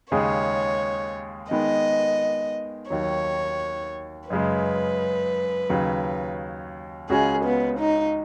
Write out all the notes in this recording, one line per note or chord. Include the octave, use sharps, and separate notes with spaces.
D#2 C#3 G#3 C#4 G#4 C#5
D#3 G#3 B3 D#5
D#2 D#3 F#3 C#5
F#2 C#3 G#3 B4
D#2 C#3 F#3
C#2 C#3 G#3 C#4 F#4 G#4
B3
D#4